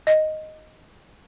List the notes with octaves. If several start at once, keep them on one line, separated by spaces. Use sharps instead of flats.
D#5